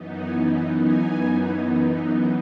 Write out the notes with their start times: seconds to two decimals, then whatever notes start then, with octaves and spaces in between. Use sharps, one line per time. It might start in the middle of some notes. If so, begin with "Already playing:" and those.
Already playing: F#2 E3 B3 D#4
0.21 G#5
0.51 F#5
0.80 G#5